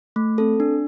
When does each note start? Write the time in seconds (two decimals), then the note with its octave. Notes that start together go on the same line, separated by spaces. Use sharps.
0.16 A3
0.38 C4 A4
0.60 D4